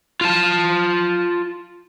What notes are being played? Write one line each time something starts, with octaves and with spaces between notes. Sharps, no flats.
F4 A5